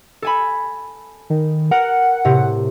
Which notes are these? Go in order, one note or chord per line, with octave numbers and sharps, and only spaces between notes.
A4 G#5 B5
D#3
A#4 F#5
A2 C3